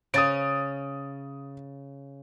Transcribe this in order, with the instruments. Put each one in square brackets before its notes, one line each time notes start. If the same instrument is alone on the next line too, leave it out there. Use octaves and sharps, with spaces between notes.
[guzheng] C#3 C#4 [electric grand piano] D#6 A6 D7